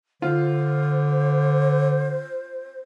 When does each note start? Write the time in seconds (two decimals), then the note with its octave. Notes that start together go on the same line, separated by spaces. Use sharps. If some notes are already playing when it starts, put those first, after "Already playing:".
0.22 D3 F4 C5